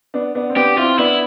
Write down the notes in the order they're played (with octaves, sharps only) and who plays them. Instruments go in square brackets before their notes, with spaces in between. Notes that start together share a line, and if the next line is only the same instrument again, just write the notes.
[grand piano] B3 D4
B3 D4
C4
[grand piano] B3 D4 [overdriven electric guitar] G4
[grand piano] C4 E4 [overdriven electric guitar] F4
[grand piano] B3 D4 [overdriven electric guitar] E4